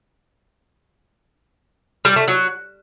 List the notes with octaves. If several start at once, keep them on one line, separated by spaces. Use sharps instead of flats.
G3
A3
F#3